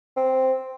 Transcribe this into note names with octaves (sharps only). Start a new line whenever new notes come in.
C4